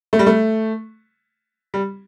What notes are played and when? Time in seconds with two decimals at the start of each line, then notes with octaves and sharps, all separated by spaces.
0.13 A3
0.19 G3
0.26 A3
1.74 G3